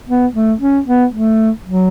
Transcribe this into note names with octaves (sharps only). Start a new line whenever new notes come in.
B3
A3
C#4
B3
A3
F#3